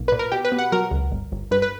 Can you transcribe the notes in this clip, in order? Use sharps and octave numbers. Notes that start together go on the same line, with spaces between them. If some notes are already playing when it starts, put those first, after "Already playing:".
Already playing: B1 A#3
A#2 B4
A#4
B2 G4
B4
B2
F#5
F#3 A#4
C#2
G1
G1
G2 B4
B4